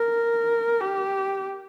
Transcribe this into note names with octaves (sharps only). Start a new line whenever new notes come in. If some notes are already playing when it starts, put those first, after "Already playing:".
Already playing: A#4
G4